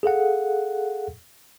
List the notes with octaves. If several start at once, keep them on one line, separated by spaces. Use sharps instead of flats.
G#4 A4 F5 F#5